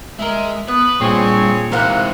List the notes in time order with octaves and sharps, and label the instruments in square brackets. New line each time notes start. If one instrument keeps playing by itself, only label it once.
[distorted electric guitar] G#3 [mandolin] A#4 E5
[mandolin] B3 [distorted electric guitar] B4
[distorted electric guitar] G2 [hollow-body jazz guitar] A#2 [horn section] C4 G#4 C#5
[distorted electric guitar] G#2 E3 [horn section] C3 [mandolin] A#4 F5 F#5